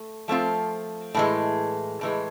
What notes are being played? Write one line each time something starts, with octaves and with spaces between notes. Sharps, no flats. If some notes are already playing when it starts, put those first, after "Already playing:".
Already playing: A3
F3 A3 C4 F4
A2 E3 G#3
A2 E3 G#3